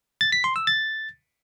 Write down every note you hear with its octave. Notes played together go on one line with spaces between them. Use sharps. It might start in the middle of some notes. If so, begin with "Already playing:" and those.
A6
B6
C6
E6
A6